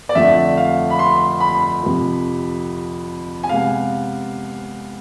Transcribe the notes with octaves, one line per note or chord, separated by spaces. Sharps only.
D5
F2 D3 F3 A3 E5
F5
B5
C6
B5
F2 C3 F3
G#5
C3 G#3 B3 F5